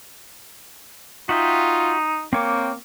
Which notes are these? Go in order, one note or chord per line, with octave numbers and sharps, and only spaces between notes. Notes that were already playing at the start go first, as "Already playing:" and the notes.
D#4 F4 F#4 E5 G5
A#3 C4 C#5 G5 D6